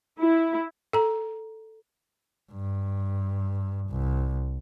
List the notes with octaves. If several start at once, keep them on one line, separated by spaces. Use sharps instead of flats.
E4
A4 A#5
G2
C2